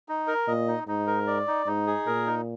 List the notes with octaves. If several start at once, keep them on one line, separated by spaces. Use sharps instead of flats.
D#4
A#4
A#2 D#5
D#4
G#2 D#4
A#4
D5
D#4
G#2 D#4
G#4
A#2 A#4
D#4